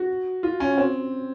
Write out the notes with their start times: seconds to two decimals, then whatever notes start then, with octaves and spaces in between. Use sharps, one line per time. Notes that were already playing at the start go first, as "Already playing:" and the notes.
Already playing: F#4
0.43 F4
0.60 C#4
0.78 C4